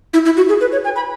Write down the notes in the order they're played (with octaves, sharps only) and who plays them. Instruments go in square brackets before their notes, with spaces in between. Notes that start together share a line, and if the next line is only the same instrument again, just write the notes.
[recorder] E4
E4
F#4
G#4
B4
C#5
G#5
B5